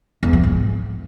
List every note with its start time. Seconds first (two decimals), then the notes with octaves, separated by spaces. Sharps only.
0.23 E2
0.33 F3
0.43 G#2